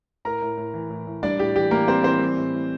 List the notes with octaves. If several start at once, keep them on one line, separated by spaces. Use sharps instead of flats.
A2 A#4 A#5
A2
A2
E3
A2
A2
G3 D4 D5
A2 G4
E3 G4
E3 A#3 A#4
G3 C4 C5
E3 C4 C5
G3
A2
A2